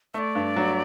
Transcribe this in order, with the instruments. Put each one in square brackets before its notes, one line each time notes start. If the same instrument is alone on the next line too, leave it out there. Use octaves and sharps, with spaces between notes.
[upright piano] A3 [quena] D5 E5
[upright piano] G2
F#3